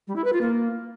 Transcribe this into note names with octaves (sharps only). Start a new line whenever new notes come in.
G3
E4
B4
F4
A#3